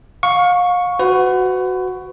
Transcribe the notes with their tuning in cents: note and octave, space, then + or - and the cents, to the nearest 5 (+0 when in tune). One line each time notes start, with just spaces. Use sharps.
F5 +35 C#6 +0
F#4 +0 B4 +35